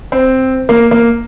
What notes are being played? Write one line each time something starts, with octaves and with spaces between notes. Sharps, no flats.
C4
A#3
A#3